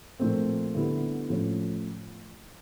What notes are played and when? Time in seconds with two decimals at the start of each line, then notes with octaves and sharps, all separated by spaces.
0.20 A#2 F3 A3 C4
0.75 D3 G3 B3 E4
1.30 A2 F3 A3 C#4